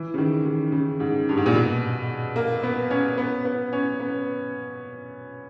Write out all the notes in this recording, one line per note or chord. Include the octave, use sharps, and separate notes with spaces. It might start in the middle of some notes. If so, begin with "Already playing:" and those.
Already playing: E3
C#3
D#3
D#3
C#3
G#2
G2
G#2
A#2
B2
A#3
B3
C#4
B3
B3
C#4
B3